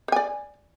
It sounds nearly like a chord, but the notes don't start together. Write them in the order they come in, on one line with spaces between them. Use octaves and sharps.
C5 G#5 D5